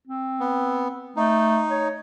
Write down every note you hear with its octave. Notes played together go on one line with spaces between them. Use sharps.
C4
B3
A3 D#4
C#5